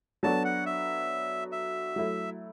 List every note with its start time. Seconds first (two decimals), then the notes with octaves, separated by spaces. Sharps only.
0.23 F#3 B3 D4 F#4 A4 A5
0.45 F#5
0.66 E5
1.52 E5
1.96 F#3 A3 E4